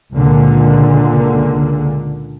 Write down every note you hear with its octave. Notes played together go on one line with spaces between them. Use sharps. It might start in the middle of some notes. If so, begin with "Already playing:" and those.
C#2 A#2 D3